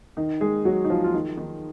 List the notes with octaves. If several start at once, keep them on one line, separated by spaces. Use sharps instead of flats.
D#3 D#4
G#3 G#4
F#3 F#4
D#4
F3 F4
F4
D#3 D#4
D#3 D#4